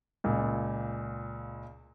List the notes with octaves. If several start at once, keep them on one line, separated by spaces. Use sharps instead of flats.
C#2 A#2